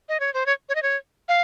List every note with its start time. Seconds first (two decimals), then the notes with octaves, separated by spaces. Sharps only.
0.09 D#5
0.20 C#5
0.34 C5
0.46 C#5
0.69 C#5
0.75 D#5
0.83 C#5
1.29 F5